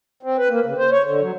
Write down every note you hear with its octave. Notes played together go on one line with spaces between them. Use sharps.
C4
B4
A#3
C#3
C5
C#5
D3
F#3